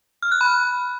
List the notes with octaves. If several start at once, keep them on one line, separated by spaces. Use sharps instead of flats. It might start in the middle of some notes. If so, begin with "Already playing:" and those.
F6
F#6
B5